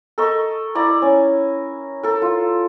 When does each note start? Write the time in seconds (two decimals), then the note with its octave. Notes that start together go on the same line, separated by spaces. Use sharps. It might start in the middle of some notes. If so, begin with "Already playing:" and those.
0.18 A4 A#4 D#5 C#6
0.75 E4 D5 A#5
1.02 C#4
2.03 A4 A#4
2.22 F4